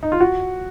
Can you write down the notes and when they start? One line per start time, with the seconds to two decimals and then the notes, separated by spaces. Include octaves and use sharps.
0.03 D#4
0.12 F4
0.20 F#4